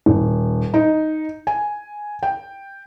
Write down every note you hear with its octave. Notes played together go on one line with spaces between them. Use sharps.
D#1
D#4
G#5
G5